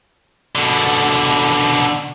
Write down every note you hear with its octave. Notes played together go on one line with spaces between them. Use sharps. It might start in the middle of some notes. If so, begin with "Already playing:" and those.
B2 D3